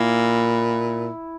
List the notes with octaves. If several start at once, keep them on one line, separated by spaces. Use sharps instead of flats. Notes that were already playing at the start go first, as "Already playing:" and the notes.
Already playing: A#2 E4